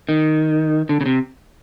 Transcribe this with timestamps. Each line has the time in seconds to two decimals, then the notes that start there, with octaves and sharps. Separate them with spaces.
0.09 D#3
0.89 D3
1.01 C#3
1.06 C3